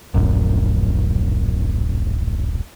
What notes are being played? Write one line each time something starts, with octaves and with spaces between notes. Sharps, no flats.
D1 A#1 F#2